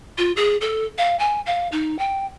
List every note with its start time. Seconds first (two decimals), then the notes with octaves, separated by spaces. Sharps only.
0.18 F4
0.36 G#4
0.61 A4
0.98 F5
1.19 G#5
1.46 F5
1.72 D#4
1.99 G5